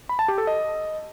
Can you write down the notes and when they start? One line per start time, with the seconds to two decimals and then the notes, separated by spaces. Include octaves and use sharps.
0.09 B5
0.19 A5
0.28 G4
0.38 A4
0.47 D#5